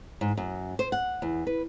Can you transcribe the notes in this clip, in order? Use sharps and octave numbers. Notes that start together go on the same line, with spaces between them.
G#2
F#2
C5
F#5
E2
B4